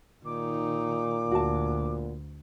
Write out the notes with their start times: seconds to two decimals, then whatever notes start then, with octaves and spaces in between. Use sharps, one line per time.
0.24 A#2 D#3 D#4 D6
1.31 D2 F#4 A5